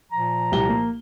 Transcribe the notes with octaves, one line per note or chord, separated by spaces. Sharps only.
A#2 F3 A#5
C2 G4 G7
A#3